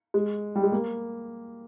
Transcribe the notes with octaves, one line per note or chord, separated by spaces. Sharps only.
G#3
G3
G#3
A#3